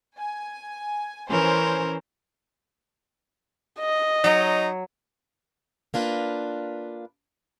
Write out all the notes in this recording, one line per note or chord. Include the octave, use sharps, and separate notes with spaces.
G#5
E3 C#4 A#4 C5
D#5
F#3 D#4 C#5
A#3 D4 F4 B4